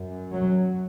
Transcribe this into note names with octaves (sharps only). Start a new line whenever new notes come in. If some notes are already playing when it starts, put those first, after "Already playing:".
Already playing: F#2
F#3